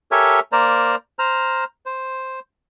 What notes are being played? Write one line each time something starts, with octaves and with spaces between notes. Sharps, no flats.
G4 A4 A#4 C#5 E5 G#5
A#3 A#4 C5 D5 A#5
C5 A#5 F6
C5